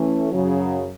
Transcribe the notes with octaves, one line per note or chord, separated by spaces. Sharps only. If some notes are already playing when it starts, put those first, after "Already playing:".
Already playing: E3 A3 C#4
F#2 C#3 F#3